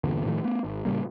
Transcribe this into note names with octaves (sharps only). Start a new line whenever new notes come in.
G1 E2 A#2 D3
A2 D#3 F3 A3
A3 B3
G#1
A2 C#3 G3 A#3